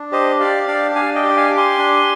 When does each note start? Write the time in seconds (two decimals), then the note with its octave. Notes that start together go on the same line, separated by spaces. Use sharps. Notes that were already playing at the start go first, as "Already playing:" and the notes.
Already playing: D4
0.12 G4 C5 D#5
0.40 G4 D5 F5
0.67 D4 D5 F5
0.95 D4 F5 G#5
1.15 D#5 G5
1.23 G4
1.30 G5
1.37 F5 G#5
1.50 G4 D6
1.57 G#5 C6
1.78 D4